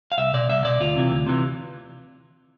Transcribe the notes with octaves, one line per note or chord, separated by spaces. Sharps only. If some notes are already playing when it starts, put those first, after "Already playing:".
F5
C2 E5
B2 D5
C2 E5
B2 D5
D2 F4
C3 E3
D2
C3 E3